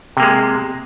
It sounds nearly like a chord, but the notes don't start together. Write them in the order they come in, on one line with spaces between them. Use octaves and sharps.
C3 A#3 G#3